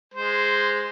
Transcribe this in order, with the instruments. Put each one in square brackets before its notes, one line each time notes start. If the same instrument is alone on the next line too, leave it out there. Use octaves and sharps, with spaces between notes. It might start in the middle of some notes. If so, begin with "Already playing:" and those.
[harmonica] G#3 C5